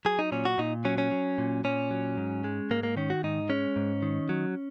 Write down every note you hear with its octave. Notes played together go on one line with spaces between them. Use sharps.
F#3 G#4
D#4
A#2 C#4
F#4
A#2 D#4
F#3 C#4
C#4
F#3
A#2
A#2 C#4
F#3
G#2
G#3
G#2 A#3
A#3
D#3 C#4
F#4
G#2 D#4
G#3 C#4
G#2
D#3
F#3